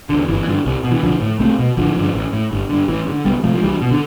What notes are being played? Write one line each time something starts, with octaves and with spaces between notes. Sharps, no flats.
E2 D3
G1 E3
G2 D3
C2
B2
E3
B1 D3 F3
A2
C2 A3 C4
B2
A1 D3 F3
G2 D3
A1
A2
G1
G2 D3
A1 E3
G2
D3
C2 G3 B3
C3 F3 A3
F3
C2 E3 G3
B2
D3